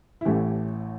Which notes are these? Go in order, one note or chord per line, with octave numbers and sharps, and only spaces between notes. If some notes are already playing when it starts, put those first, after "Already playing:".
E4
A1 A2 E3 A3 G4